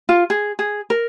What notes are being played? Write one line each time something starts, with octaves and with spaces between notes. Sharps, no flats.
F4
G#4
G#4
A#4